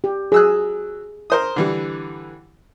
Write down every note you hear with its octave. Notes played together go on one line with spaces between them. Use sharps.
G4
F#3 G#4 E6 F#6
A#4 C5 D#6
D3 E3 G3